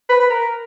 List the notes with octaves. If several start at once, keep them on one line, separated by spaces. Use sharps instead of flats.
B4
B4
A#4